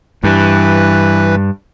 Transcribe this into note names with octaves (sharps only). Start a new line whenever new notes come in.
G2 E3 B4